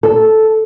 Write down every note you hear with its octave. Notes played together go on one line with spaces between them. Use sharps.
A4